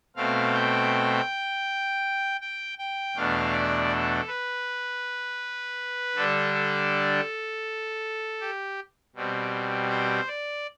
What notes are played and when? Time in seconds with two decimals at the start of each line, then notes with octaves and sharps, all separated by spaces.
0.16 B2 A3 C4 F5
0.54 G5
2.41 G5
2.78 G5
3.16 E2 B2 A3 D4 F5
3.53 D5
3.90 A4
4.28 B4
6.15 D3 G3 D4 A4
6.54 A4
8.41 G4
9.15 B2 G3 C4
9.90 C5
10.28 D5